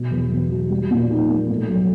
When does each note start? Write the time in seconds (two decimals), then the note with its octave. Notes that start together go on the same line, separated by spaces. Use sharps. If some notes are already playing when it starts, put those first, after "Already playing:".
Already playing: B2
0.11 E2
0.31 E2
0.52 F#3
0.70 G3
0.91 A#2
1.11 D#4
1.30 A#3
1.50 A2
1.68 B1